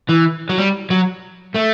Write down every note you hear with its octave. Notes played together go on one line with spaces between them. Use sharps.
E3
F#3
G3
F#3
A3